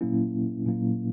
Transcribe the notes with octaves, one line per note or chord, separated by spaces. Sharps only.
A#2 F#3 A#3 C#4 E4
A#2 F#3 A#3 C#4 E4